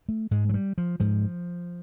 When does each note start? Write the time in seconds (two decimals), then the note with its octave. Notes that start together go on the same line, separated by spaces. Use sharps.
0.09 A3
0.31 G#2 G#3
0.49 F#3
0.54 G3
0.78 F3
1.00 G#2 F3